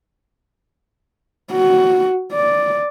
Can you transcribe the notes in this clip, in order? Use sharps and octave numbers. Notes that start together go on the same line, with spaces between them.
F#4
D5